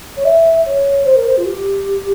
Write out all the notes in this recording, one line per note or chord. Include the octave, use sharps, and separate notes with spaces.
C#5
E5
C#5
C5
A#4
C5
F4
G4